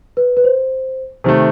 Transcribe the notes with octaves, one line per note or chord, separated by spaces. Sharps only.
B4
B4
C5
C3 D#3 A3 C5